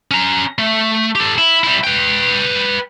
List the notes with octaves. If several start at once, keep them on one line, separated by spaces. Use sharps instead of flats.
C#4 A#5
A3
G4 A4
E4
G3 E4
B4 G5